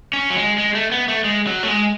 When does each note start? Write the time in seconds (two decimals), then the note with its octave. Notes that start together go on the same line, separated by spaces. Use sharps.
0.13 C#4
0.30 F#3
0.36 G#3
0.58 G#3
0.75 A3
0.92 B3
1.08 A3
1.24 G#3
1.47 F#3
1.63 A3
1.68 G#3